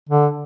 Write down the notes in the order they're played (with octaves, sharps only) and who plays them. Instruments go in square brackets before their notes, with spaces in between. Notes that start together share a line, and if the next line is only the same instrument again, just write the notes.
[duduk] D3